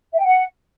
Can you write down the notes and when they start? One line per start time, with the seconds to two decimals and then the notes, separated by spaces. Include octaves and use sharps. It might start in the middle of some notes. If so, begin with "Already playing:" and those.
0.13 E5
0.18 G5
0.24 F#5